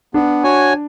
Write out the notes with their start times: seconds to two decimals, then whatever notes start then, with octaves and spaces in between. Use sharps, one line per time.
0.14 B3 D4
0.44 F#4 C#5 G#5